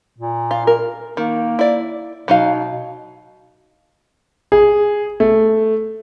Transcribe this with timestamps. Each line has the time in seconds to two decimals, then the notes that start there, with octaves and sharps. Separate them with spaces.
0.18 A#2
0.51 F4
0.67 A#4
1.17 D#3 A#3
1.59 E4 D5
2.28 B2 F#3 D#4 F5
4.52 G#4
5.20 A3